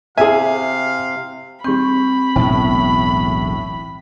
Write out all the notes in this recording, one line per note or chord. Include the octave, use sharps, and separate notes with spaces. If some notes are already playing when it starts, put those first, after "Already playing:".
C3 E4 G#4 E5 F5 G#5
G3 C4 B5 C#6 G6
E1 B1 A2